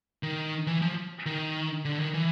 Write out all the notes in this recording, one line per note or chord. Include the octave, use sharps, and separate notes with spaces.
D#3
E3
F3
D#3
D3
D#3
E3